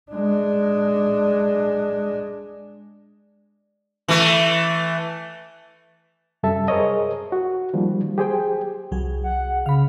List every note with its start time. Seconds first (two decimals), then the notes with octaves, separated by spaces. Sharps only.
0.11 G#3 D4
4.08 E3 A3
6.43 F#2 C3 G3 A4 E5 A5
6.68 G#4 A#4 C5 C#5 D#5
7.32 F#4
7.73 D#3 F3 G3 A#3
8.17 F#3 G4 G#4 C5 G5
8.92 C2 F#3 G#4
9.24 F#5
9.66 C#3 F5 B5